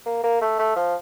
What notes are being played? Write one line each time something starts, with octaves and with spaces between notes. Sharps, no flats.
A#3
A#3
A3
A3
F3